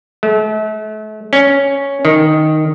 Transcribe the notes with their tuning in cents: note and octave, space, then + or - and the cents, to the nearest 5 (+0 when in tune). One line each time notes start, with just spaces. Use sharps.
A3 -40
C#4 +0
D#3 +0